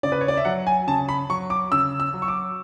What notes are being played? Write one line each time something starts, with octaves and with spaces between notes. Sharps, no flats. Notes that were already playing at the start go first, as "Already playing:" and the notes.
C#3 D5
B4
C#5
D5
E5
F#3 F#5
G#5
C#3 A5
B5
F#3 C#6
D6
C#3 E6
E6
F#3
C#6
D6